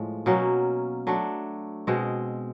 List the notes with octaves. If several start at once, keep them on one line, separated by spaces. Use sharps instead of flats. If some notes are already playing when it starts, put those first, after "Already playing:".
Already playing: A2 F3 G#3
B2 F#3 A#3 C#4
F#3 A3 D4
B2 G#3 C4